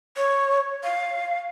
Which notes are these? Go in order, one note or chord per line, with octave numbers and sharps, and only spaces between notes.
C#5
F5